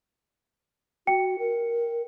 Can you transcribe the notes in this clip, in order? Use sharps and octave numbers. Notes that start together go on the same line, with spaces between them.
F#4 G5 C#7
A#4